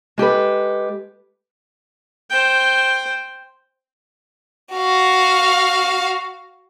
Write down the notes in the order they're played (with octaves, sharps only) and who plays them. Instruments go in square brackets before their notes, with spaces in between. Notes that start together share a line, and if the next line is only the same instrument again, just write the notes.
[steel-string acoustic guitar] G#3 G4 A4 B4
[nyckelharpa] C5 G5
[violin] F#4 F5